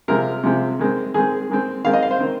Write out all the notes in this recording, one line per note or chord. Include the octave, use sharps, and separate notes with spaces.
C3 F3 G#3 C4 A#4
C3 F3 G#3 C4
D#3 G#3 C4
D#3 G#3 C4 G#4
D#3 G#3 C4
D#3 G#3 C4 F5
D#5
F5
C5
D#3 C4